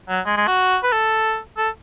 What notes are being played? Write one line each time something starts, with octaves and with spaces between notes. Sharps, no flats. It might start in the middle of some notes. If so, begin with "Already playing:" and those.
F#3
G#3
G#3
F#4
B4
A4
A4